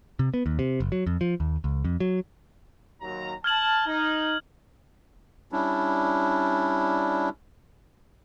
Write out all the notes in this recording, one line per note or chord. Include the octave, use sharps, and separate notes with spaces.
C3
B3
D#2
C3
F#1
F#3
F2
F3
D#2
C#2
F2
F#3
D#2 F#3 A#5
A5 F6 G#6 F#7
D#4
G3 C#4 D4 E4